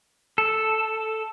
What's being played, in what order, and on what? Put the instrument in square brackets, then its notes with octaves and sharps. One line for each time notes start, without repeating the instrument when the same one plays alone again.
[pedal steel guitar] A4